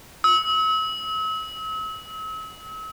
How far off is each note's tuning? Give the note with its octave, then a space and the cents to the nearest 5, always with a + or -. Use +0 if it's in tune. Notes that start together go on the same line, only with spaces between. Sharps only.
E6 -40